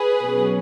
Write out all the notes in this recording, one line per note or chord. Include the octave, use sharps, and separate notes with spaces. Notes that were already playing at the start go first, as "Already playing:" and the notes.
Already playing: G#4 B4
B2 F#3 C#4